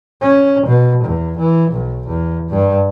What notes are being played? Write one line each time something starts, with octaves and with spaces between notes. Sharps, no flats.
C#4
B2
E2
E3
B1
E2
G2